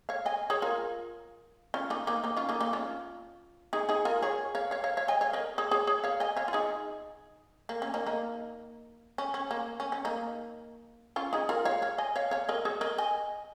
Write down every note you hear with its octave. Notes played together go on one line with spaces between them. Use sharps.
C#5 F5
D#5 G#5
G#4 C#5
F4 A#4
C#4 F4
A#3 D#4
A#3 D#4
A#3 D#4
C#4 F4
A#3 D#4
A#3 D#4
C#4 F4
D#4 G#4
D#4 G#4
F4 A#4
G#4 C#5
C#5 F5
C#5 F5
C#5 F5
C#5 F5
D#5 G#5
C#5 F5
A#4 D#5
G#4 C#5
G#4 C#5
G#4 C#5
C#5 F5
D#5 G#5
C#5 F5
F4
D#4 G#4
A#3
C#4
A#3 D#4
A#3 D#4
C#4
C#4
A#3
C#4
C#4
A#3 D#4
C#4 F4
D#4 G#4
F4 A#4
C#5 F5
C#5 F5
D#5 G#5
C#5 F5
C#5 F5
A#4 D#5
G#4 C#5
A#4 D#5
D#5 G#5